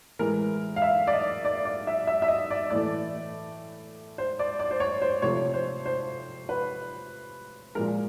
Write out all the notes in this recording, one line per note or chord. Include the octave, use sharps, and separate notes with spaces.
A2 E3 G#3 A#4
F5
E5
D5
D#5
D5
D5
E5
E5
E5
D#5
D5
A2 E3 A3 D5
C5
D5
D5
C5
C#5
C5
C3 F3 A3 C#5
C5
C5
B4
A#2 F3 G#3 A#4